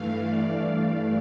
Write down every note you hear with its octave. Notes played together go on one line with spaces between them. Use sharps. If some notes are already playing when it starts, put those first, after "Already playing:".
Already playing: G2 E3 A3 F5
D5